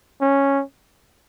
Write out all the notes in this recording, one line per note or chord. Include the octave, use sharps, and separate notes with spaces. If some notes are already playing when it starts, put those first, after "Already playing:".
C#4